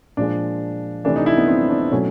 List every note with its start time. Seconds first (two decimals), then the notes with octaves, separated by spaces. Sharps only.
0.17 A#2 F3 G#3 D4
1.04 C3 E3 A3 D4
1.16 D#4
1.26 E4
1.37 B3
1.48 C4
1.70 D4
1.92 B2 F#3 A3 C#4